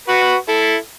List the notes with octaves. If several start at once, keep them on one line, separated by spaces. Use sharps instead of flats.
F#4 B4
E4 A4